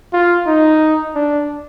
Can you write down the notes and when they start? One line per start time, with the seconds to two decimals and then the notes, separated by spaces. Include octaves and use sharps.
0.13 F4
0.47 D#4
1.15 D4